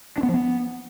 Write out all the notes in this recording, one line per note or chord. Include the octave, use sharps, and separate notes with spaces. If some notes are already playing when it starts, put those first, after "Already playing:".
D4
B3
F3
B3